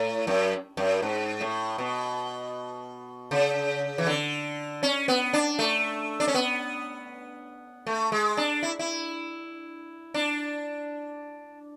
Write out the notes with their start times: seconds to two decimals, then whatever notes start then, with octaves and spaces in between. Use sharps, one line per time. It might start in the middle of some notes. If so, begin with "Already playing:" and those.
Already playing: A2
0.27 F#2
0.77 F#2
1.02 G#2
1.41 A2
1.78 B2
3.31 C#3
3.98 E3
4.07 D3
4.83 C#4
5.08 B3
5.33 D4
5.59 A3
6.20 D4
6.28 C#4
6.34 B3
7.87 A3
8.12 G#3
8.37 D4
8.63 E4
8.79 E4
10.14 D4